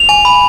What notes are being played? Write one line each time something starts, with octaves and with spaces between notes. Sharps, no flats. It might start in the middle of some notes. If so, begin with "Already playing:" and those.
Already playing: F7
G#5
B5